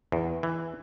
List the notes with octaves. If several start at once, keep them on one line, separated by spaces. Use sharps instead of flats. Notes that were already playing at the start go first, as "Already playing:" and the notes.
E2
E3